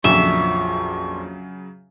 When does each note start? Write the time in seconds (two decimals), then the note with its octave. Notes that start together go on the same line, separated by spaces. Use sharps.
0.04 A#1 F2 C#3 F#3 E5 C#6